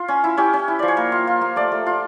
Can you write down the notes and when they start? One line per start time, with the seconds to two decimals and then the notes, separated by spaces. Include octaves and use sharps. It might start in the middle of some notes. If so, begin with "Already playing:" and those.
Already playing: F4
0.08 C#4
0.24 E4
0.37 C#4 G4
0.53 C#4
0.68 E4
0.79 F3 D5
0.88 C#5
0.97 A#3 A#4
1.12 F4
1.27 F4
1.41 A#3
1.56 A3 D5
1.72 A3
1.86 F4